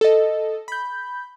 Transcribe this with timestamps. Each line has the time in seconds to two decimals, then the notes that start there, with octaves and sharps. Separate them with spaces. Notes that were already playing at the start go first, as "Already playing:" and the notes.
0.01 A4 D#5
0.68 B5 G6